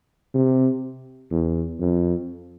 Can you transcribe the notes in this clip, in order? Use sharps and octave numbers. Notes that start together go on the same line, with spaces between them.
C3
E2
F2